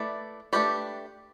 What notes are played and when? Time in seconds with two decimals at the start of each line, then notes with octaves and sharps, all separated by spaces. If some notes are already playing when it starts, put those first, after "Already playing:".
Already playing: A3 E4 B4 D5
0.53 A3 D4 G4 B4 D5